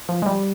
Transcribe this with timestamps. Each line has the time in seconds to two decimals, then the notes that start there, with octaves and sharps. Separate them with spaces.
0.09 F3
0.22 G#3
0.26 G3